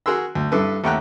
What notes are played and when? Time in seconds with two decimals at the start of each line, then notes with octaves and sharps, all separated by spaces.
0.06 F#4 G#4 A#4 C6 E6
0.35 D2
0.52 G2 E4 A4 B4
0.84 D#2 A3 F#5 G5 A#5 F#6